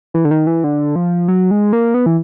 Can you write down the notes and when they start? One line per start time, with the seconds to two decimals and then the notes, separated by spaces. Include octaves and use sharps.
0.14 E3
0.25 D3
0.31 D#3
0.47 E3
0.64 D3
0.96 F3
1.28 F#3
1.51 G#3
1.73 A#3
1.94 B3
2.06 E3